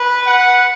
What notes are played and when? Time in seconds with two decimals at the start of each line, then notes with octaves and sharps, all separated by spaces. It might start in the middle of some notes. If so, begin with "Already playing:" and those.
Already playing: B4
0.26 F#5